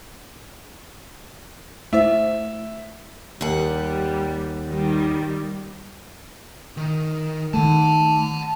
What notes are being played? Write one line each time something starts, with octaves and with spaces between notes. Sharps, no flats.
A3 E4 C5 E5
D#2 G3 F#5
D#3 G3
D#3
D#3 A3 F#5 A5